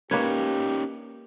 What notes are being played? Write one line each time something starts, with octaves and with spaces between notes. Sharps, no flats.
A#3 C#4 D#4 G4 B4 C#5